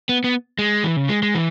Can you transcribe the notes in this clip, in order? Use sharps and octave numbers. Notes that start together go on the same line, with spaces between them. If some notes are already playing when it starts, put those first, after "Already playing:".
B3
B3
G#3
E3
C#3
G#3
G#3
E3